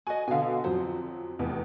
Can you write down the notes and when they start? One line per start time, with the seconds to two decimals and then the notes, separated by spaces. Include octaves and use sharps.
0.07 F#4 D#5 G#5
0.28 B2 D3 F5 G#5
0.64 F2 F#3 C5
1.39 F1 E2